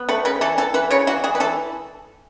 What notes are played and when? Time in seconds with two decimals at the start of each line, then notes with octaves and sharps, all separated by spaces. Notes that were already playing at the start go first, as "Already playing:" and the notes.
Already playing: B3
0.09 A3 B4
0.25 C#3 B4
0.41 E3 A4
0.58 E3 A4
0.74 E3 B4
0.90 C#3 C#5
1.07 E3 F#4
1.24 E3 G#4
1.35 B4
1.40 E3 A4